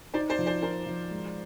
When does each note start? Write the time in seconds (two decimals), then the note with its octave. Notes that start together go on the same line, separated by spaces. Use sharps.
0.14 D#4 C5 D5
0.29 C5 D5
0.39 F3
0.46 C5 D5
0.62 D#4 A#4 C5
0.86 F3
1.11 G#3